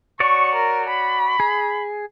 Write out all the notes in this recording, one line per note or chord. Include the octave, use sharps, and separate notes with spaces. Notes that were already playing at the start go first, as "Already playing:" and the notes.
F#4 C#5 D5 C#6
A#4
B5
G#4